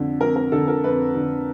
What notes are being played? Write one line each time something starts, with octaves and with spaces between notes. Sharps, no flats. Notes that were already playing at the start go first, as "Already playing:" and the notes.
Already playing: F2 D3
F2 A#4
A#4
D3 A4
A#4
F2 B4
D3